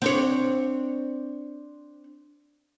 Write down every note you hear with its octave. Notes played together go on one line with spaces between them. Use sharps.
C4 D4 C#5